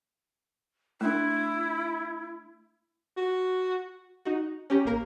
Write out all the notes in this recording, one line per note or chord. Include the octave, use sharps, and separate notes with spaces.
A3 D4 E4
F#4
D#4 F#4
C#4 G4 A#5
A1 A#3 A#4 A#5